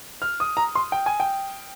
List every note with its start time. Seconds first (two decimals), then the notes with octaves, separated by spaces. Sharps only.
0.22 F6
0.40 D#6
0.57 A#5
0.75 C6
0.92 G5
1.06 G#5
1.20 G5